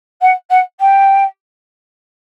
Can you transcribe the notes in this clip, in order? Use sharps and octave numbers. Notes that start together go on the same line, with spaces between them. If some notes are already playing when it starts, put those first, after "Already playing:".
F#5
F#5
G5